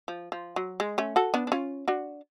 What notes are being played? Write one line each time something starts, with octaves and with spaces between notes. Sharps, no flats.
F3
F3
F#3
G#3
A3 C#4
F#4 A4
B3 D4
D4
C#4 F4
D4 F#4